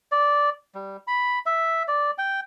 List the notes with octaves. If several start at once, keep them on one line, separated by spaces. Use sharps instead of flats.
D5
G3
B5
E5
D5
G5